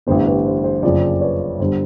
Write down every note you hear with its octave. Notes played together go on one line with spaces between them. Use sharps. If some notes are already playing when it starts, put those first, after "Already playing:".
A1 G2 D3 G3 B3 C5
B4
C5
C5
F#1 F2 C#3 F3 C5 D5
B4 C#5
G1 D3 G3 C5